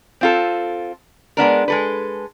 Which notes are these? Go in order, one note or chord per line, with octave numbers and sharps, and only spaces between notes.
C4 F4 A4
G#3 B3 D4 A#4
G#3 A4 B4